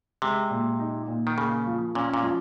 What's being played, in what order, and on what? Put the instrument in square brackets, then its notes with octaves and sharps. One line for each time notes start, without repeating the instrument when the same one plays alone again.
[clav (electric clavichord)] C3 [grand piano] G#3
[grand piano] A#2
D#4
A#2
[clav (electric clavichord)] D#3
[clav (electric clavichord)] C#3 [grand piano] A#3
[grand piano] F3
[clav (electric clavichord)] A#2 [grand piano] C#4
[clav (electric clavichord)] A#2
[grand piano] F3